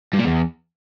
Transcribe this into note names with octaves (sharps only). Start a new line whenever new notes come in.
G2
A#2
E2